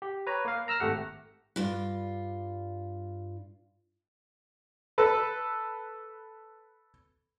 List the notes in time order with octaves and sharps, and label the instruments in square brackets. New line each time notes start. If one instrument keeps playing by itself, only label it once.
[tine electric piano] G4
B4 C#5 A#5
A#3 F5
A#5 E6 F6 A#6
G#1 A3 G4 F#5
[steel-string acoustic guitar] G2 F4
[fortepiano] A4 B4